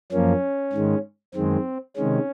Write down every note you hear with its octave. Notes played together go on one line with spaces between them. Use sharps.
F#2 F3 A#3 C#4
G#2 D#3 G#3
F#2 D#3 G#3 C4
C3 D#3 G#3 C#4